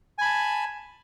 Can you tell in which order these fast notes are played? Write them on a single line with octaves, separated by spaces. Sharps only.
G#5 B5 A5